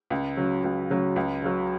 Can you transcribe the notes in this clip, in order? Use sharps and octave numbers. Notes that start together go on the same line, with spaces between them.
C#2
C#3 F#3
C#2
C#3 F#3
C#2
C#3 F#3